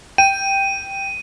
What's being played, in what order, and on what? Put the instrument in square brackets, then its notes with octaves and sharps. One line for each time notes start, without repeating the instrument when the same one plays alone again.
[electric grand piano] G5 [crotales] D#7